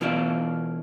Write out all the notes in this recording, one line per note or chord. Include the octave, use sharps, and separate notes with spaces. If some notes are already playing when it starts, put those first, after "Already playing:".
B2 E3 F4 D5 E5